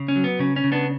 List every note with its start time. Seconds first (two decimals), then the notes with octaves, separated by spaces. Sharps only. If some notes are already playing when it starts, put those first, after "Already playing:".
Already playing: C#3
0.08 C#4
0.16 F#3
0.24 B3
0.39 C#3 C#4
0.56 C#4
0.64 C#3
0.72 B3 D4